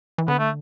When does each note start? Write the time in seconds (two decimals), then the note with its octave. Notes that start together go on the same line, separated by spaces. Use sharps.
0.18 E3
0.28 D3 B3
0.39 A3